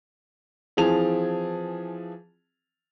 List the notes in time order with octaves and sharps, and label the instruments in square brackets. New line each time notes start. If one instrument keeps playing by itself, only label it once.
[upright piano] E3 F3 C4 G#4 A5 F7